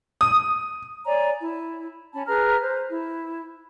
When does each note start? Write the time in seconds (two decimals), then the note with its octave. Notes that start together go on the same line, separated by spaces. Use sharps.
0.21 D#6
1.05 C#5 D5 G#5 A#5
1.42 E4
2.13 C#4 A5 B5
2.27 G#4 B4 A#5 F6
2.62 C5
2.89 E4